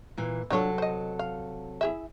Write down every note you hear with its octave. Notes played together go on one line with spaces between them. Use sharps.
A#2 E3
C3 F#3 D4 F4 A4 C#5
C5 D#5
F5
E4 G#4 E5